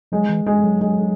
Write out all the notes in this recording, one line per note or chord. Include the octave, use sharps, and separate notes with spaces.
F#3 G#3
E3
G#3
F#3
G#3